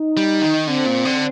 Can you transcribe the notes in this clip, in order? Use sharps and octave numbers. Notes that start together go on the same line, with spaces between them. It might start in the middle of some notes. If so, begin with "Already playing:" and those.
Already playing: D#4
G3
D#3
D3 C4
A#2
D3